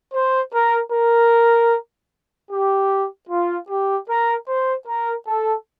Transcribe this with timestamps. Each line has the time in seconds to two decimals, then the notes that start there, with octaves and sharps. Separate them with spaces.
0.14 C5
0.54 A#4
0.93 A#4
2.51 G4
3.30 F4
3.70 G4
4.09 A#4
4.48 C5
4.87 A#4
5.28 A4